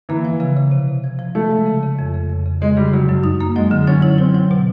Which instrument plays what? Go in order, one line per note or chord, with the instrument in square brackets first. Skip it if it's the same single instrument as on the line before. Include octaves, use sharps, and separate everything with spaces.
[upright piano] E3 [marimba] A#3
[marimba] F3
C#3
C#3
C3
C3
F3
F3
[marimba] F3 [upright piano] A3
[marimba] G#3
C#3
C#3
F2
C#3
F2
C#3
[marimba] C#3 [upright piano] G#3
[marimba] C#3 [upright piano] G3
[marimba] C#3 [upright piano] F#3
[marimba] F#2
D#4
A#3
[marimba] F#3 [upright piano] G#3
[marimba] D3
[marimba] F#3 [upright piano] C#4
[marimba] E4
[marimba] F#3 [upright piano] C4
[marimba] F#3
B2